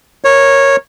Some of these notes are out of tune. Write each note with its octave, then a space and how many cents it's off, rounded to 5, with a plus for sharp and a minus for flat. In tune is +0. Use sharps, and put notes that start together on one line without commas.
A#4 +0 C#5 -10